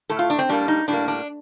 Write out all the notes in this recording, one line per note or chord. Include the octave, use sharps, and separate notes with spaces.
A2 A3 A4
F4
D4
C4
A2 G3 A#3 D4
D#4
A2 G3 A#3 D4
D4